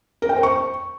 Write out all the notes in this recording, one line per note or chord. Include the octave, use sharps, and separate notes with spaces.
A#4
G5
C5
C#6